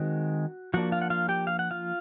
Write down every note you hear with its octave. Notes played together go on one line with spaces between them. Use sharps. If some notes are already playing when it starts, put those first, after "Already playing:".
Already playing: D#3 G#3 C4 F#4
F3 A#3 D4 F#4 F#5
F4 F5
F#5
F4 F5
G4 G5
F5
F#5
F4 F5